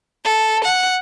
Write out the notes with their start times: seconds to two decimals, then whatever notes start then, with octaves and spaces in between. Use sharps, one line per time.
0.25 A4
0.64 F#5